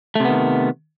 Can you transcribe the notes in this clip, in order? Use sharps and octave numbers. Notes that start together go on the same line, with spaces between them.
C3 D#3 A3 B3